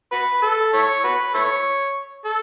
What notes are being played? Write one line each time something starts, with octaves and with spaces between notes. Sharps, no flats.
F#4 B4
A4
E4 A4 C#5
F#4 B4
E4 A4 C#5
A4